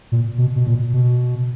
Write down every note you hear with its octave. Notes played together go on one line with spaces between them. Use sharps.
A#2
B2
B2
A#2
B2